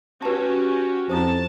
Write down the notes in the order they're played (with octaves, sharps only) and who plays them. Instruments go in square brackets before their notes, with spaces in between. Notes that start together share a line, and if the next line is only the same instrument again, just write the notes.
[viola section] C#4 F#4 G4 [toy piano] B4 A5
[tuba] F2 [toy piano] E4 A4 C5 [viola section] A5